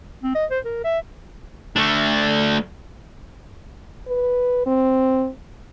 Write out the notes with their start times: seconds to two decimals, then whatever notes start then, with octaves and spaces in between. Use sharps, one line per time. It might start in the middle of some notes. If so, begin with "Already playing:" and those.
0.23 C4
0.35 D#5
0.50 C5
0.65 A#4
0.84 E5
1.76 A3 D4
4.07 B4
4.66 C4